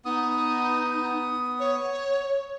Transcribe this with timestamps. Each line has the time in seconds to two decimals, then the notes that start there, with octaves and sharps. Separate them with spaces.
0.05 B3 D#4 D#6
1.60 C#5